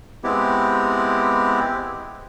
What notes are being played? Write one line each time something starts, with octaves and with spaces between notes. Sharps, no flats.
G#3 B3 C4 E4 G4